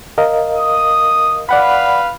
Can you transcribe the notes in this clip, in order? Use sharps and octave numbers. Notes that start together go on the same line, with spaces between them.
A#4 D#5 F5
D#6
B4 D5 F5 F#5 B5